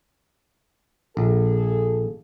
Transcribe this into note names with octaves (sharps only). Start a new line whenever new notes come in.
A#1 G#4 A4